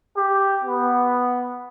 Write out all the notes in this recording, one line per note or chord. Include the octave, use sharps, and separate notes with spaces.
G4
B3